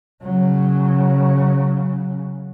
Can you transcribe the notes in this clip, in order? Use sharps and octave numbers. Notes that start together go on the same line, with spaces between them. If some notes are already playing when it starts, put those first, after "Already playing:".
C#3 F#3